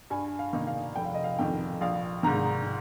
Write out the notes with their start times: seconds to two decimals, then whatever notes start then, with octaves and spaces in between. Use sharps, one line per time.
0.10 G2 G#5
0.39 F5
0.53 D#3 A#3 D#4
0.67 F5
0.96 F1 G5
1.05 F5
1.14 D#5
1.24 F5
1.38 F2 D#3 G5
1.81 A#1 F5
2.23 G#2 D#3 A#5